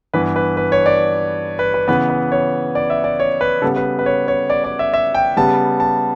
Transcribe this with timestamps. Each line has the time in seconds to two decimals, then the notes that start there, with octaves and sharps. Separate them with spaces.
0.14 G2 E3 B3 B4
0.36 B4
0.57 B4
0.72 C#5
0.86 D5
1.59 B4
1.74 B4
1.88 C#3 E3 B3 B4
2.10 B4
2.32 C#5
2.75 D5
2.90 E5
3.04 D5
3.20 C#5
3.41 B4
3.62 C#3 G3 B3 A4
3.76 B4
3.99 B4
4.06 C#5
4.28 C#5
4.50 D5
4.64 D5
4.79 E5
4.94 E5
5.15 G5
5.37 C#3 G3 B3 A5
5.80 A5